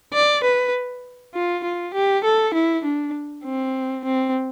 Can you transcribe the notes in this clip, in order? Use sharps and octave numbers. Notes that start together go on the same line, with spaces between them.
D5
B4
F4
F4
G4
A4
E4
D4
C4
C4